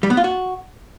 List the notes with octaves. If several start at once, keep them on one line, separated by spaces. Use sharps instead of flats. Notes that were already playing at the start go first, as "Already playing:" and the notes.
G3
B3
F4
F#4